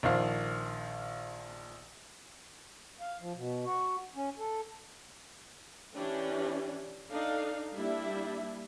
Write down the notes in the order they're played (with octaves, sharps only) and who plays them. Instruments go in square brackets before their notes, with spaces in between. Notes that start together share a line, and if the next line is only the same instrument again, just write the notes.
[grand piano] A#1 D#3 F3 C5 F5 F#5
[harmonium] F5
F3
B2
F#4
C#4
A4
[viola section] E3 C#4 D4 G4
D4 D#4 A4 F5
G3 A#3 D4 E4 E5